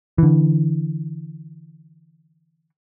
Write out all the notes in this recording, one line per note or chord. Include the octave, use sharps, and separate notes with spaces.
D3 E3